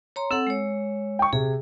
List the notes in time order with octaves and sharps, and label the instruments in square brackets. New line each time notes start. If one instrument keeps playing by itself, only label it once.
[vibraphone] C#5 A#5 C6
[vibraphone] C4 A4 F#5 [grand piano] E6
[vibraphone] G#3 C#5
[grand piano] G5 C#6
[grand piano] C3 [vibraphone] G#4